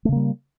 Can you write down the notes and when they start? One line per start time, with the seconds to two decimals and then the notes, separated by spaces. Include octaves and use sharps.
0.05 A3
0.09 C#3
0.12 A#3
0.16 G3